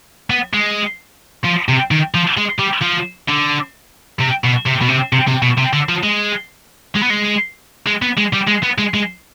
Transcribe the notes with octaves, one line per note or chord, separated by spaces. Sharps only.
B3
G#3
F3
C3
D#3
F3
G#3
G3
F3
D3
C3
B2
C3
B2
C3
C3
C3
B2
C3
D3
F3
G#3
G#3
B3
G#3
G#3
B3
G#3
G3
G#3
B3
G#3
G#3